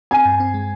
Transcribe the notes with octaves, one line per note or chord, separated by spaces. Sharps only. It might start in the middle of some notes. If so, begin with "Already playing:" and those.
C4 G#5
G2
C4
G#3